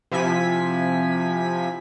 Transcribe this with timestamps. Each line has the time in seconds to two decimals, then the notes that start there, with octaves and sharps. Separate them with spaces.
0.12 C3 F3 E4 G#5 B6